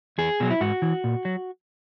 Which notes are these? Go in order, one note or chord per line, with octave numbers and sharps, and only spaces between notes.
E2 G#4
B2 F#3
E4
G#2 F#4
E3
A#2
F#3